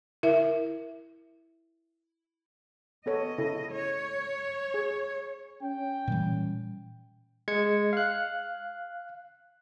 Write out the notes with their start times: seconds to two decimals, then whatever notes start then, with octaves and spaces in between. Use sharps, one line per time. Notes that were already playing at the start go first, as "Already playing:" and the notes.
0.23 E4 A#4 E5
3.06 B3 A4 C#5 D#5
3.38 C#3 E4 A4
3.72 C#5
4.74 G#4
5.63 C#4 G5
6.07 A#2 E3 G3
7.48 G#3 G#6 C#7
7.93 F5 F#6